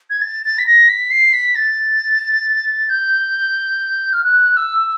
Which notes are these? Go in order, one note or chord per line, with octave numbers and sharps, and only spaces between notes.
G#6
A6
A6
B6
A#6
B6
C7
B6
A6
G6
F6
F#6
E6